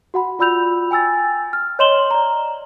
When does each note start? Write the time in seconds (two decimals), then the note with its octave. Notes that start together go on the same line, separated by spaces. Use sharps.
0.14 F#4 F#5 B5
0.39 F4 D5 B5 E6 G6 F7
0.91 G5 G#5 E6 A6
1.53 F6
1.79 C#5 D#5 C6 E7 F#7 G7
2.11 D5 A#5